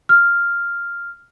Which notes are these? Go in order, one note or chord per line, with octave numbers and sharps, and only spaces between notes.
F6